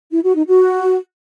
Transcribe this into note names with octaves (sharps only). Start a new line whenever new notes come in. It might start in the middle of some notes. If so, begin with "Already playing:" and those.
E4
F#4
D#4
F#4